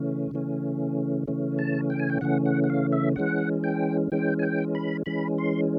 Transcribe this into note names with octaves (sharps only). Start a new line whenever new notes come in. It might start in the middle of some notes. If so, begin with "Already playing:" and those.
Already playing: C#3 E3 A3 C#4
C#3 E3 A3 C#4
C#3 E3 A3 C#4
A5
G5
G#5
G5
C#3 E3 A3 C#4 F#5
F#5
F#5
F5
E5
E3 G#3 C#4 F#5
G5
E3 G#3 C#4 G5
G#5
G5
B5
E3 G#3 C#4 B5
C6